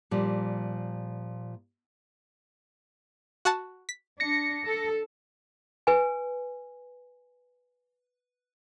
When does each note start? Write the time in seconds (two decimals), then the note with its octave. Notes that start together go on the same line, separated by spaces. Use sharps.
0.11 A#2 F3 G3
3.45 F#4 F#5 A5
3.89 B6
4.20 D4 A#6 C#7
4.66 A4
5.87 B4 G#5